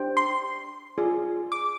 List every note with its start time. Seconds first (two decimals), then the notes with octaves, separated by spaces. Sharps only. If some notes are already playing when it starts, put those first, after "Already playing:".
Already playing: D4 G4 C5 G5
0.17 C6
0.98 F4 G#4 D5
1.52 D6